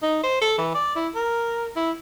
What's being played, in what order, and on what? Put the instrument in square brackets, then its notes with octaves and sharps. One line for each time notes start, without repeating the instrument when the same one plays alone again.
[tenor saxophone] D#4
C5
A4
E3
D5
E4
A#4
E4